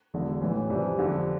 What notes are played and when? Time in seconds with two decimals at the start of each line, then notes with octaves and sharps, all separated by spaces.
0.14 E1 E2 D3
0.41 A1 A2 E3
0.69 F2 C3 E3 G3 D4
0.98 G1 F2 D3 G3